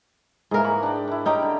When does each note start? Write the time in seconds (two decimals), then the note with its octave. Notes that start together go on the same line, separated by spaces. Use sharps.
0.51 G#2 E3 A#3 G#4 A#4
0.64 B5 C#6
0.83 D4 G5
1.08 D#3 E4
1.26 C#4 D#4 G4 G5
1.42 D3